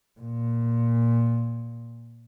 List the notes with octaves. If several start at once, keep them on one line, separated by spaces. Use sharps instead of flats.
A#2